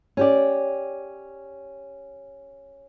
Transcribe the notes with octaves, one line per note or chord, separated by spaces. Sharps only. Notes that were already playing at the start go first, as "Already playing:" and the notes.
C#4 G4 D5